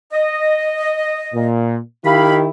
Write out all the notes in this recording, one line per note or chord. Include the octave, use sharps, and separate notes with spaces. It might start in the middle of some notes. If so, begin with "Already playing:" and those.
D#5
A#2
D#3 E4 G4 F5 B5